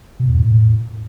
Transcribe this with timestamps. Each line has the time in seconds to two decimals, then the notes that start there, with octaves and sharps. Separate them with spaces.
0.20 B2
0.28 E2
0.37 A2